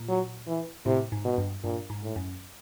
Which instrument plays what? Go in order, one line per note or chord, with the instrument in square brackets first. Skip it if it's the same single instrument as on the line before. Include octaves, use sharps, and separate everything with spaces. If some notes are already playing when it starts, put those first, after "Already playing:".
Already playing: [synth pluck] A#2
[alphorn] F#3
E3
[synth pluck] A2 [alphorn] C3
[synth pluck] G#2
[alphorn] B2
[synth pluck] G2
[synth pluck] G2 [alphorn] A#2
[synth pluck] G#2
[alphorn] A2
[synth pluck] F#2